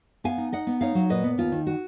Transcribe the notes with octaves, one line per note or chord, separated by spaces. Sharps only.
B3 F5 G#5
D#4
D#4 D#5 F#5
B3
D#4 C#5 F5
F#3
A#2 B4 D#5
B3
D#2 F4
D#3
F#4